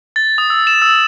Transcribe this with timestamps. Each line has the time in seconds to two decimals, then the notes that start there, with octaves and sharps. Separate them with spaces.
0.16 A6
0.38 D#6
0.50 E6
0.67 E7
0.82 E6